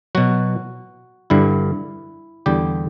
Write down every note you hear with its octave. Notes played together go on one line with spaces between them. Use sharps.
B2 F#3 F#4
G2 D3 G3 E4
E2 D3 G3 G4